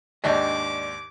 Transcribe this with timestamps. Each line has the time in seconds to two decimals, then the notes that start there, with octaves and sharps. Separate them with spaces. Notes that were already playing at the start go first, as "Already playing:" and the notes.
0.24 D#2 G#2 D4 D#5 E5 G5 D6